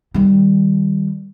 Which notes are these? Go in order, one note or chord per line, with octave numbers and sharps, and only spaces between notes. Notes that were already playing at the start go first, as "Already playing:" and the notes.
D#3 G3